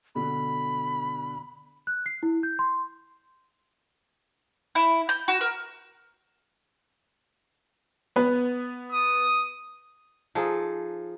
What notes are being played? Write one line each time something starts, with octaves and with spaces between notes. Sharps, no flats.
B2 D3 B5
F#6
C7
E4
G6
C6
E4
G6
F#4
A#4
B3 B4
D#6
F3 D#4 G#4 A4